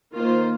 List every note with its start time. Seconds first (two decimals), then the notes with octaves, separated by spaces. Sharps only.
0.13 D#3 A#3 F4 C5